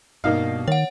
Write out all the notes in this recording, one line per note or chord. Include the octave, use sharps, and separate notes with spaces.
G2 B2 G3 A#3 D#4 F5
D#3 C#5 F#5